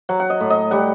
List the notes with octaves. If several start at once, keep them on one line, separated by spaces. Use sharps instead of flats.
F#3 F#5
F#5
D#5
A2
D#5
G3 F#5